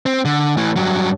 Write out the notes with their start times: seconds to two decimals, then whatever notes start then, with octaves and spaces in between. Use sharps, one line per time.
0.06 C4
0.25 D3
0.57 A2 E3
0.76 G2 F#3